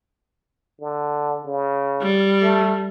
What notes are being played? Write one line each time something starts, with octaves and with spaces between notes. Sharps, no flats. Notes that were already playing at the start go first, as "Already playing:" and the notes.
D3
C#3
G3
A3